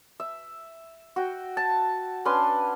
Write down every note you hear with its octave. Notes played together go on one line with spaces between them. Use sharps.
E5
F#4 G5
A5
C#4 D4 B4 C6